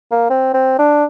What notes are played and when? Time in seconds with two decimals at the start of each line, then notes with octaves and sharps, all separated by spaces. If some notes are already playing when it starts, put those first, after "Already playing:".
0.11 A#3
0.30 C4
0.54 C4
0.79 D4